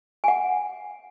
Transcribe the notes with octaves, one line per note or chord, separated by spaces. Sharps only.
F#5 G#5